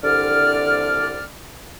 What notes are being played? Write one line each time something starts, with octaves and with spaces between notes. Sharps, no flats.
C2 D3 D5 F6